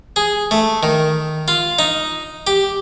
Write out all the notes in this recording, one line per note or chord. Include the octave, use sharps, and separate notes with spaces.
G#4
A3
D#3
F4
D#4
G4